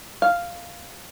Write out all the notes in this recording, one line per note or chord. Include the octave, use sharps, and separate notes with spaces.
F5